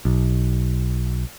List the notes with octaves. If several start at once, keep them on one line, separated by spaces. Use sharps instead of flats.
B1